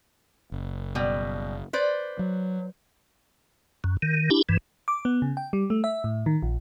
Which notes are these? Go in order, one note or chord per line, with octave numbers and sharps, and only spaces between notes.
F#1
B2 G3
B4 C5 D5
F#3
F#2
D#3
D4 E4 G4
G2 E3
D6
B3
C#3
G5
G3
A3
E5
A2
D#3
A#1